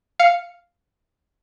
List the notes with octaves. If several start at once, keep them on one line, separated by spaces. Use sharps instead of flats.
F5 C#7